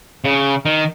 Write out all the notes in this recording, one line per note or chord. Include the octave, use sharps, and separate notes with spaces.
C#3
D#3